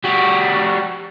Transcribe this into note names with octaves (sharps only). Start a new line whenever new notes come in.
G3 F#4